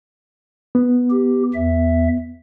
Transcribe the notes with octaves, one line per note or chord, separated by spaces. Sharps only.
B3
G4
E2 E5